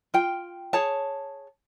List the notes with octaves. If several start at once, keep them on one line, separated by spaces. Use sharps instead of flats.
F4 G5
G#4 C#5 A5